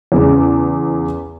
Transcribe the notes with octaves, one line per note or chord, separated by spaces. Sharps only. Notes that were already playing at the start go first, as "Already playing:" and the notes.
E2 C#3